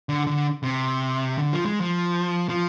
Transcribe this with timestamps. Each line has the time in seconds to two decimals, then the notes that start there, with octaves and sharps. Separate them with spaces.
0.09 D3
0.27 D3
0.63 C3
1.38 D3
1.53 F3
1.66 G#3
1.81 F3
2.49 F3